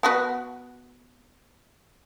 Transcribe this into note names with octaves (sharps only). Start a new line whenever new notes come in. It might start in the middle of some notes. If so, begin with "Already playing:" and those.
B3 F#4 B4